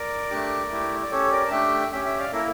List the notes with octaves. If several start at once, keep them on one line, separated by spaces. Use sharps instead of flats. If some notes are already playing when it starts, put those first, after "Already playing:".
Already playing: A#4 D5
A3 D4 G4
A3 E4 G4
D5
C#4 G4 A4 C#5
A#4 D5
A5
A3 D4 G4 E5 G5
C#4 G4 E5 G5
E5 G5
D5 F5
A#3 E4 A4 A#4